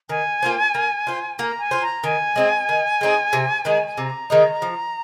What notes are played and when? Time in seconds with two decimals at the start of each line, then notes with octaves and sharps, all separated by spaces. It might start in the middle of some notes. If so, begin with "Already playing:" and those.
0.09 D#3 G#5
0.43 A#3 F4 C5
0.75 A#3
1.07 F4 C5
1.39 A#3 A#5
1.60 G#5
1.71 F4 C5
1.83 A#5
2.03 D#3 G#5
2.36 G#3 C4 D#4
2.69 D#3
3.01 G#3 C4 D#4
3.33 C3
3.65 D#3 G#3 D#4
3.98 C3 A#5
4.30 D#3 G#3 D#4
4.62 F3